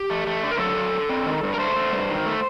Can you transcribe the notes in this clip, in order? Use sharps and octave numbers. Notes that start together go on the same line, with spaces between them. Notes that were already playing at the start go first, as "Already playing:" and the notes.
Already playing: G4
A3
A3
D3
A#4
F#3 A4
D3
D3
C4
D#3
G2
A#4
A3 C5
A3
G2
D#3
A3